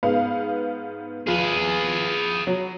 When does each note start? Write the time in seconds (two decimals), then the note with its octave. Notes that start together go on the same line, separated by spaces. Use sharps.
0.03 G#2 B3 F5
1.27 F3 F4 G#4 B4
2.47 F#3